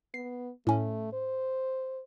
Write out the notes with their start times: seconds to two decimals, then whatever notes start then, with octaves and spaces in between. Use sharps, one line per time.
0.14 B3 C7
0.67 A2 A3 C#4
1.13 C5